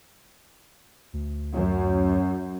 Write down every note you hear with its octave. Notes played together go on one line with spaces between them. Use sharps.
D2
F#2